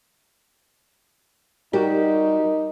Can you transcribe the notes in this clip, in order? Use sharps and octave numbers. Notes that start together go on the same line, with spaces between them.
G3 D#4 F#4 G4 A#4